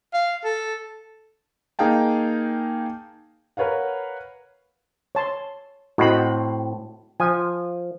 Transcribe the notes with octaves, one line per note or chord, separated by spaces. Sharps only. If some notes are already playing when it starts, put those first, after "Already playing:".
F5
A4
A#3 D#4 G#4 F5 G5 A5
A#4 B4 C#5 F5 F#5
C#5 A5 C6
A2 C4 F#4 D#5 B5
F3 G#5